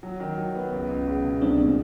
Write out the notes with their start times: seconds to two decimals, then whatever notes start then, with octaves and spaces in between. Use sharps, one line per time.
0.03 F#3
0.20 D#3
0.38 F#3
0.55 B3
0.72 C#2
0.90 C#2
1.07 C#2
1.24 B2
1.41 C2 C4 D4
1.59 A#2